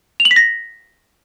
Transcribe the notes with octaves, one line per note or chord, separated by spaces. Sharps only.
F7
F#7
B6
A#6